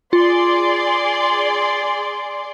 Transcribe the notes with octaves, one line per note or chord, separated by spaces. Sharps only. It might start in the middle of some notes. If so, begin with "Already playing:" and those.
F4 G#4 D5 C6